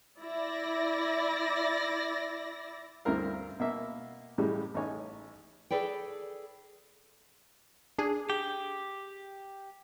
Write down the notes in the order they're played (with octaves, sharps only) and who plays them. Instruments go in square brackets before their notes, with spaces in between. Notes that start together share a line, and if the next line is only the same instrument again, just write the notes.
[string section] E4 D5 A#6
[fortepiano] D2 G2 C4 E4 A#4 F5
B2 A#3 E5
A2 C#3 E3 G3 G#3
A1 D#4 C#5 G#5
[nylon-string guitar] G#4 A4 B4 D5 G5
[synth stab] D4 G#4
[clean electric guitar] G4